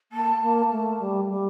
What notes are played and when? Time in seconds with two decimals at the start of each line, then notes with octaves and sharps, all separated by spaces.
0.12 A#3 A5
0.42 A#3
0.71 A3
1.00 G3
1.30 G3